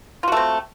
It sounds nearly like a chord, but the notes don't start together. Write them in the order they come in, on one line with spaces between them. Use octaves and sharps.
F4 F#4 A3 C4